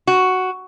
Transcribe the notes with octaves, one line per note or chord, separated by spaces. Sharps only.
F#4